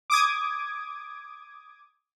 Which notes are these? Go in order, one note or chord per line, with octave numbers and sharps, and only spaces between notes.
D6 D#6 G#6